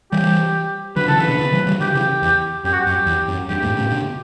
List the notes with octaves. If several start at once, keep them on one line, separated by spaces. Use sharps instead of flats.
E3 G3 G4
D3 F#3 B4
C#3 E3 A4
C#3 E3 B4
B2 D3
C#3 E3
E3 G3
E3 G3
D3 F#3 G4
C#3 E3
E2
F#2 G4
F#4
G4
F#2
E2
F#2
E2 G2 G4
F#2 A2
A2 C#3
B2 D3